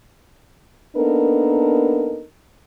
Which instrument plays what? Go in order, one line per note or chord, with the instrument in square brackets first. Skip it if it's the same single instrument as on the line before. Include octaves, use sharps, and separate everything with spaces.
[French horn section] A#3 B3 D4 D#4 A4 A#4